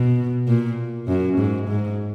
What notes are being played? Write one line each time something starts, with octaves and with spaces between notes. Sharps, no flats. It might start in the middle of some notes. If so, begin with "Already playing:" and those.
Already playing: B2
A#2
F#2
G#2
G#2